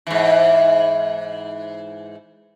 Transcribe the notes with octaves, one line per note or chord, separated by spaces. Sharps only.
G#2 E3